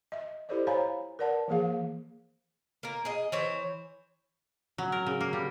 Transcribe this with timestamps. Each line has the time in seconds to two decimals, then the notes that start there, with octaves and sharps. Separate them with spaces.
0.12 D#5 E5
0.49 E4 G4 A4 C5 D5 D#5
0.67 C5 C#5 F5 G#5 A#5 B5
1.19 A#4 B4 D5 F#5 A5
1.48 E3 F3 A#3 G#4 F5
2.83 A#3 A#4
3.05 G#4 D#5
3.32 E3 C5 C#5
4.78 F#3
4.92 A#4
5.06 C#3
5.21 A#3
5.33 G3